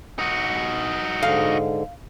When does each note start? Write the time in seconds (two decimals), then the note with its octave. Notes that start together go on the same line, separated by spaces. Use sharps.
0.19 D#4 F#4
1.23 G#2 D3 F5